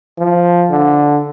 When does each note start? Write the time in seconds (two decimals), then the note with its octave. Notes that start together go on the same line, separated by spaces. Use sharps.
0.18 F3
0.71 D3